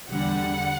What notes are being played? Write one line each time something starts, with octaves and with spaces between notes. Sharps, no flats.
E2 D3 G3 F#5